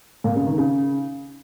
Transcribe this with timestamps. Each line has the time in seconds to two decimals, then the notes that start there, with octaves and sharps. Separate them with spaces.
0.24 A#2
0.35 C#3
0.47 D#3
0.58 C#3